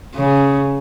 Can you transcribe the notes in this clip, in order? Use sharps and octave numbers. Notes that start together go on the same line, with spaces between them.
C#3